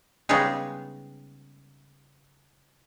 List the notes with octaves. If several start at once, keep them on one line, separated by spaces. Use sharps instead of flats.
C#3 G3 G#3 B3 D#4 G#4